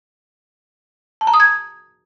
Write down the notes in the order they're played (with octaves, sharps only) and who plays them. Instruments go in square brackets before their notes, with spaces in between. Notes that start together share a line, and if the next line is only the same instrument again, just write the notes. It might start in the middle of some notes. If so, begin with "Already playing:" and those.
[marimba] A5
A#5
D#6
G#6